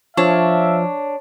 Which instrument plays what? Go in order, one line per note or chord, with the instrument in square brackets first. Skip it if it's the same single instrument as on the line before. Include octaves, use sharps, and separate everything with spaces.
[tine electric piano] F3 [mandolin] D4 [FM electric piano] C#5 [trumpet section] E5 F5